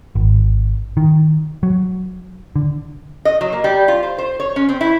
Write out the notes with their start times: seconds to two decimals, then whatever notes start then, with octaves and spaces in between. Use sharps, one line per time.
0.15 G#1
0.97 D#3
1.63 F#3
2.56 D3
3.25 D#5
3.41 F#3
3.53 A#3
3.64 G3
3.88 F4
4.03 C5
4.18 C5
4.40 C#5
4.56 C#4
4.69 C4
4.81 E4